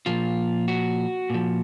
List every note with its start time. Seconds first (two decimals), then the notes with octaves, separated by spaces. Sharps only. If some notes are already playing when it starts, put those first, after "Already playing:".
0.06 A#2 F3 F4
0.68 F#4
1.30 A#2 F3